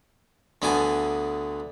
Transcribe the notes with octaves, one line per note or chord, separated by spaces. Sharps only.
D2 D3 B3 G#5 D6